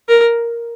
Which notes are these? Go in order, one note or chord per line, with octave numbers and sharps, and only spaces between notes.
A#4